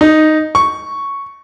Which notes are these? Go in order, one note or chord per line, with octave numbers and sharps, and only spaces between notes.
D#4
C#6